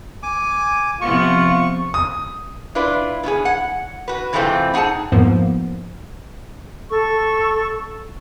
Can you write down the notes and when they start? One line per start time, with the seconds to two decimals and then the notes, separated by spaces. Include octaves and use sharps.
0.23 G#5 D6
1.01 C3 F3 B3 F4 C#6
1.94 D#6
2.75 D4 E4 F4 B4
3.23 B3 C#4 E4 G#4
3.45 F#5
4.08 F#4 B4
4.33 C3 E3 G#3 A3 C4 F4
4.74 D#4 G#4 F#5 G#5 A5
5.12 F2 G#2 F3 A#3 B3
6.89 A4 C#6